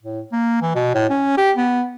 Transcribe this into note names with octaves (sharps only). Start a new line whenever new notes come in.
A2
A#3
E3
B2
A2
C#4
G4
B3